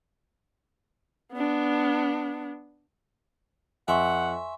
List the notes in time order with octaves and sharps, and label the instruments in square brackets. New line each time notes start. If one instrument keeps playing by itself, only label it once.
[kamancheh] B3 D4
[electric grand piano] F2 [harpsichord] E5 [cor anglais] F#5 [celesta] G#5 C6 C#6